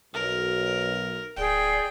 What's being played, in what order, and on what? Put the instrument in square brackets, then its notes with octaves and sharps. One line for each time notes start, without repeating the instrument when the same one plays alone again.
[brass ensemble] B1 [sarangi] A#4
[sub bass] D1 [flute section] G#4 D5 [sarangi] G5